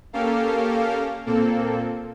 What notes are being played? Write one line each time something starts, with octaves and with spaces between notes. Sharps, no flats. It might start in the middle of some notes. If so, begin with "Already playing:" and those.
A#3 C#4 G4 A4 A#4 F5
A#2 A#3 C4 A4